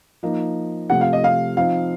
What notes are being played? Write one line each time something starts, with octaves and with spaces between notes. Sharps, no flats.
F3 A#3 D#4
C3 F3 A3 F#5
F5
D#5
F5
F3 C4 D#4 F5